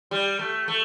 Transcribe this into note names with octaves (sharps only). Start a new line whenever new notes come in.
G3
A3
A3